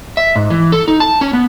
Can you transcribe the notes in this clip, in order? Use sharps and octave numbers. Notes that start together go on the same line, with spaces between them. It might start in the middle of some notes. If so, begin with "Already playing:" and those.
E5
G#2
E3
A4
D#4
A5
C#4
B3